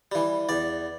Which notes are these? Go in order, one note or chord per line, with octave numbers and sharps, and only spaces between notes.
E3 G3
E2 D5